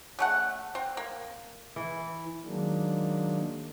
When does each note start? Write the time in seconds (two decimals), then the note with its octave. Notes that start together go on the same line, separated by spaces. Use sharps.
0.19 C#3 A3 F#5
0.75 C4
0.97 A#3
1.76 E3
2.45 D#3 F#3 G#3 A#3 D4